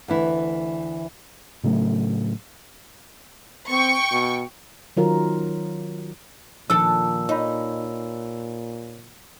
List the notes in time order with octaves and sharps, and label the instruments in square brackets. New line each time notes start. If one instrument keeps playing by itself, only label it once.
[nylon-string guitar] D2 E3 E4
[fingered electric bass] A2 C#3 F#3 A3
[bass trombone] C4 [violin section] G5 C#6
[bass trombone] B2
[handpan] D#3 F#3 F4 A#4
[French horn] A#2 [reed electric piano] D#3 F3 [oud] D4 A4 [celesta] E6
[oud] D#4 [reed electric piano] C#5 B5